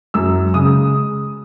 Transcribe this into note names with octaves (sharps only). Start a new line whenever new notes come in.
F#2 E6
C#3 G#3 D#6